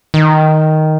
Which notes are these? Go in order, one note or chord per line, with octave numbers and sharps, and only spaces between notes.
D#3